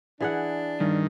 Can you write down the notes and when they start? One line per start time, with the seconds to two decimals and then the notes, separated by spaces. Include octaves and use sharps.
0.20 E3 D4 G#4 F#5
0.80 G2 D#3